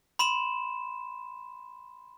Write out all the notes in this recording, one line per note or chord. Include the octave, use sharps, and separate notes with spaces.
B5 C6 E7